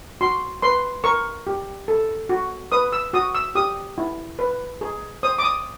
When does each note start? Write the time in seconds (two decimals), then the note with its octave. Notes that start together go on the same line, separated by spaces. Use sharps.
0.21 F#4 C6
0.62 B4 C6
1.04 A#4 C#6
1.47 G4
1.88 A4
2.29 F#4
2.72 B4 D#6
2.93 E6
3.13 F#4 D#6
3.35 E6
3.55 G4 D#6
3.98 E4
4.39 B4
4.81 G#4
5.23 C5 D#6
5.39 D6
5.43 D#6